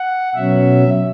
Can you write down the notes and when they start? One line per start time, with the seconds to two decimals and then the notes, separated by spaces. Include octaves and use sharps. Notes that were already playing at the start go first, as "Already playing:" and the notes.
Already playing: F#5
0.35 B2 F#3 C#4 E5